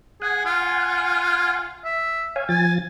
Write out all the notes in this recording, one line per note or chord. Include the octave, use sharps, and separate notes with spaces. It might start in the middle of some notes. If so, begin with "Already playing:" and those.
G#4 F#5 G#5
F4
E5
C#5 F5 G#5
F3 G#5 A6